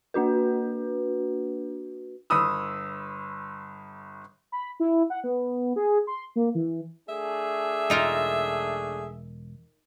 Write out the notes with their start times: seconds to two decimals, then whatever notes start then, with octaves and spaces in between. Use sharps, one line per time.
0.14 A#3 D4 F#4 B4
2.30 G1 B5 D#6 E6
4.52 B5
4.80 E4
5.10 F#5
5.24 B3
5.76 G#4
6.07 C6
6.36 A#3
6.55 E3
7.09 A3 D4 G#4 E5
7.90 E1 D#4 F4 A#4